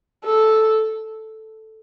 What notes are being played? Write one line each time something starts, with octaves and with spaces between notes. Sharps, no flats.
A4